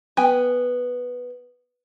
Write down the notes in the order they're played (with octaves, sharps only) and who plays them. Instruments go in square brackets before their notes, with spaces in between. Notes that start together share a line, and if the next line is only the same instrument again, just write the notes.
[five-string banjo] B3 G5 G#5